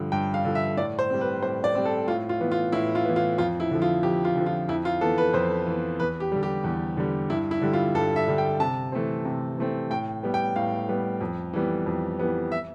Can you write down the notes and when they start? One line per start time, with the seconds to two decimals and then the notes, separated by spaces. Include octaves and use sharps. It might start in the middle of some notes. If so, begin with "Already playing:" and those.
Already playing: G2 D3 F3
0.12 G2 G5
0.34 F5
0.45 D3 F3
0.55 E5
0.77 A2 D5
0.99 C5
1.10 G3 C4
1.21 B4
1.42 A2 C5
1.64 D5
1.75 G3 C4
1.85 A4
2.07 A2 F4
2.29 F4
2.40 E3 B3
2.52 F4
2.72 A2 E4
2.95 F4
3.05 E3 B3
3.16 F4
3.38 F2 F4
3.60 E4
3.71 D3 F3
3.82 F4
4.03 F2 G4
4.25 F4
4.36 D3 F3
4.46 F4
4.69 F2 E4
4.85 F4
5.01 E3 B3 A4
5.18 B4
5.33 F2 C5
5.66 E3 B3
6.00 E2 B4
6.20 G4
6.32 D3 G3
6.43 G4
6.64 E2
6.97 D3 G3
7.30 G2 E4
7.51 E4
7.62 D3 G3
7.73 F4
7.95 G2 A4
8.16 E5
8.28 D3 G3
8.38 G5
8.60 C3 A5
8.92 E3 A3 C4
9.25 C3
9.58 E3 A3 C4
9.90 A2 G5
10.23 G3 B3
10.34 G5
10.56 A2 F5
10.89 G3 B3
11.21 F2
11.53 E3 G3 B3
11.86 F2
12.19 E3 G3 B3
12.52 E5